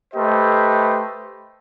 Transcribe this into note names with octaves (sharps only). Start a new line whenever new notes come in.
A3 G4 B4 C5 D#5